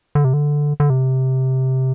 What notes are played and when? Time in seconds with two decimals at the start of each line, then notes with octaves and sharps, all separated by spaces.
0.15 D3
0.24 C3
0.33 D3
0.80 D3
0.90 C3